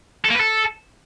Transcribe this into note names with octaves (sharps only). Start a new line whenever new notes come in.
A4
A#3
B4
A4